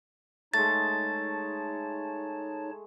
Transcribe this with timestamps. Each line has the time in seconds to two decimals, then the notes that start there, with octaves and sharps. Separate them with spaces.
0.54 G#3 A3 D#4 C#5 A5 A6